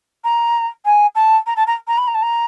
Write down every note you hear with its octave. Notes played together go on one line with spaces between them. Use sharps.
A#5
G#5
A5
A#5
A5
A#5
A#5
B5
A#5
A5
A#5